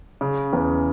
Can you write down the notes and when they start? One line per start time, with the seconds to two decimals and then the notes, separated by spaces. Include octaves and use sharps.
0.21 C#3
0.53 E2